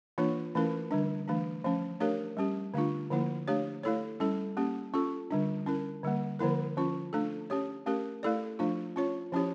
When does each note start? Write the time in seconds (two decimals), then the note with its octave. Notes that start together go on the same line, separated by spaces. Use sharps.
0.18 E3 A#3 D4 F4 C#5
0.55 E3 A3 C#4 E4 A#4
0.91 D3 G3 D4
1.27 E3 A3 D4
1.64 F3 A3 C#4
2.00 A3 D4 G4 A#4 C#5
2.37 G3 C#4 G4
2.74 D3 A3 D4 F4
3.11 D3 F3 A#3 E4
3.48 A3 D4 G4 C#5
3.83 A3 E4 A4 C#5
4.20 G3 C#4 E4 A4
4.57 A#3 C#4 G4
4.94 C#4 F4 A4
5.31 D3 G3 D4
5.66 C#4 E4 A#4
6.03 D3 G3 A#3
6.39 D3 F3 A#3 E4 A#4
6.77 F3 C#4 F4
7.13 A3 D4 A4
7.50 C#4 G4 C#5
7.86 A3 C#4 G4 A#4
8.23 A3 E4 A4 D5
8.59 F3 A3 D4 F4
8.96 C#4 F4 C#5
9.32 F3 C#4 E4 G4 C#5